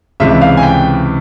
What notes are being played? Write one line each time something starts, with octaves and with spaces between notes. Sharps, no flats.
C#2 C3 E3 E5
F5
G#5
G5